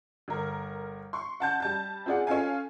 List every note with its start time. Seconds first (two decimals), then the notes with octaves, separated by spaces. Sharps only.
0.28 G1 A#4
1.13 C6 C#6
1.40 F#5 A5 G6
1.60 G3 A5 G6
2.06 C4 F4 G#4 D5 F#5
2.27 C#4 F4 A4 F5 G#5